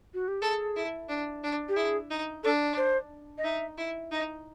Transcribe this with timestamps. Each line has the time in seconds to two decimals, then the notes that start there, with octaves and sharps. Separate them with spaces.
0.14 F#4
0.28 G4
0.41 G#4 A4
0.76 E4
1.09 D4
1.43 D4
1.69 G4
1.76 E4 G#4
2.10 D#4
2.44 D4 A4
2.77 C5
3.38 D#5
3.44 D#4 E5
3.78 E4
4.11 D#4 D#5